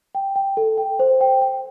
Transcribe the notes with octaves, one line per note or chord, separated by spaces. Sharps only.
G5
G5
A4
G5
C5
G5
G5